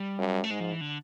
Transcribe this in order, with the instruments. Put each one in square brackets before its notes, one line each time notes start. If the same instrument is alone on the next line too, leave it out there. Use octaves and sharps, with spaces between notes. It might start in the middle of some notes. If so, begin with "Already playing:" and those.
Already playing: [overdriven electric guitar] G3
[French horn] F#2
[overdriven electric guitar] A3
[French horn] G#2 [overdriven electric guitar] G#3
[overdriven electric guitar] F3
E3
D3